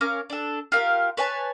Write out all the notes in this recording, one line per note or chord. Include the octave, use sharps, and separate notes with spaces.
C#4 A#4 F5 D6
D4 A4
F4 G4 A#4 F5
B4 C#5 G#5 A5